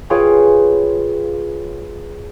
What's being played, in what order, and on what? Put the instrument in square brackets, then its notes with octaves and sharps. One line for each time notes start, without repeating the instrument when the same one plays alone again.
[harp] F4 G#4 B4 C#5 F5 G5